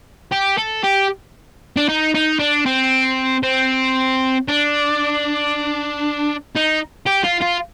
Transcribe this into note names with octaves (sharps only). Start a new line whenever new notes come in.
G4
A4
G4
D4
D#4
D#4
D4
C4
C4
D4
D#4
G4
F4
F4